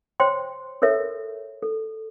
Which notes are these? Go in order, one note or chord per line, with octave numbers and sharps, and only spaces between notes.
C5 C#5 G5 C6
A4 A#4 C#5 E5
A4